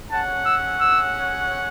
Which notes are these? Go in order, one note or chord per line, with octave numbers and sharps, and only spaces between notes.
C#4 G#4 C#5 F#5 A5
E6
E6